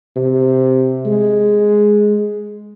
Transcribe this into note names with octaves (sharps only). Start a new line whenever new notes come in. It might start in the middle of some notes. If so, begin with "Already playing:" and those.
C3
G#3